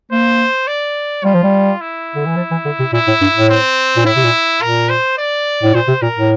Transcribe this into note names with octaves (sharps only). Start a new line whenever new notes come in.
A#3 C5
D5
G3 F4
F3
G3
E4
D3
E3
F3
E3
D3
C3
A#2 E4
A2
G2
A2
C4
A#2
A2 E4
C3
A#2
A#2 A#4
C5
D5
A2
A#2 C5
C3
A#2 A#4
A2